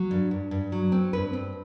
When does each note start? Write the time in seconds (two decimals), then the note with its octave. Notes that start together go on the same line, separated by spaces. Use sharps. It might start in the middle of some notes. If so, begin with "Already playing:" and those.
Already playing: F#3
0.11 G2
0.31 G2
0.51 G2
0.72 F#3
0.92 C4
1.13 G2 B4
1.33 C4